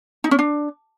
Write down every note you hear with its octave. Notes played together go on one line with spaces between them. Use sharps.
D#4
C#4
D4